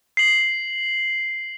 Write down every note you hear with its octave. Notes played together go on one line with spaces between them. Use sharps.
C7 F#7